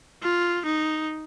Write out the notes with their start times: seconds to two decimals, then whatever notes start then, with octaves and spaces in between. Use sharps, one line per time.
0.23 F4
0.66 D#4